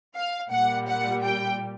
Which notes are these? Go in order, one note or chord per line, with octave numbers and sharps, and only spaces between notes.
F5
A#2 G3 F#5
F#5
G5